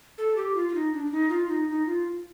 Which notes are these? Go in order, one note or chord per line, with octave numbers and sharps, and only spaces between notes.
A4
G4
F4
F4
D#4
D4
D4
D#4
F4
D#4
D#4
F4